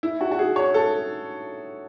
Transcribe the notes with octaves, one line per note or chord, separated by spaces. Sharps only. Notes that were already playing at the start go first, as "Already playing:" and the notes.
E4
F#4
F#4
G#4
C#5
A4